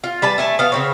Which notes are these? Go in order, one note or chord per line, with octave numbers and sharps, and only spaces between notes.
F4
G3 B4 A5
A3 G#5 A5
B3 F5
C#3 C4 C#5